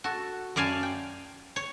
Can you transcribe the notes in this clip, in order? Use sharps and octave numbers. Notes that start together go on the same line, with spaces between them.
F#4 A4
F#2 D5 F5 G#5 A5
G5
C#5